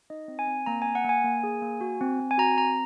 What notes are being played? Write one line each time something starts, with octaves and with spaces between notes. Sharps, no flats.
D#4 D#5
C4
G#5
C4
A#3 A#5
A#3 G#5
F#5
A#3 G#5
A#3
G#4
A#3
F#4
C4
C4
G#5
F#4 A#5
C4 A#5